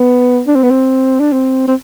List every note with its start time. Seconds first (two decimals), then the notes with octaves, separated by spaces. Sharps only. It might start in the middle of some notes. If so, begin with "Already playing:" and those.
Already playing: B3
0.47 D4
0.55 C4
0.63 B3
0.71 C4
1.20 D4
1.32 C4
1.68 C4